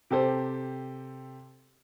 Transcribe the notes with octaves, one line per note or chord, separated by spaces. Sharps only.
C3 G4 A4 C5